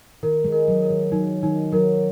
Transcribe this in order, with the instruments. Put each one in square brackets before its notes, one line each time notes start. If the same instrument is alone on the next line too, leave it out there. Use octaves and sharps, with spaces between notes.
[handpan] D#3 [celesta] A#4
[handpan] G#3
[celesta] A#4
[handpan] F#3
[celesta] A#4
[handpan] D#3
[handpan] F#3 [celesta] D#4
[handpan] D#3 [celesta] D#4
[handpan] F#3 [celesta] A#4